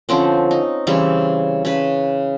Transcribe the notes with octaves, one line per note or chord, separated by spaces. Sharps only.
D3 F3 C4 C#4
D#4
C#3 E3 G3 C4
C#3 B4